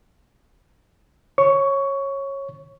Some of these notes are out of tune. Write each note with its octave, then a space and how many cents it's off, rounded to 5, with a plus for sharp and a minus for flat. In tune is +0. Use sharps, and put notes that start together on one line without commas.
C#5 -15 C#6 +15